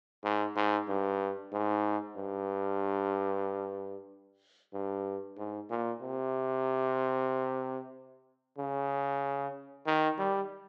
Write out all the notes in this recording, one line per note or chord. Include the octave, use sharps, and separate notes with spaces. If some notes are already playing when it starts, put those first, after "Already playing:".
G#2
G#2
G2
G#2
G2
G2
G#2
A#2
C3
C#3
D#3
G3